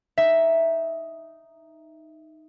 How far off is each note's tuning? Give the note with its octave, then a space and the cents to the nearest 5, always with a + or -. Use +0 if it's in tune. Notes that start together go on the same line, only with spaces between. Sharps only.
D#4 +0 E5 +0